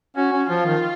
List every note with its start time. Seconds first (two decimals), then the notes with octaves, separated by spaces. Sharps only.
0.16 C#4 F#4
0.33 C#4
0.49 F3 F4
0.66 D#3